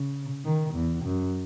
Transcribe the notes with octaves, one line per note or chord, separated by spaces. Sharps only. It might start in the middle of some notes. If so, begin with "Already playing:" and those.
Already playing: C#3
D#3
E2
F#2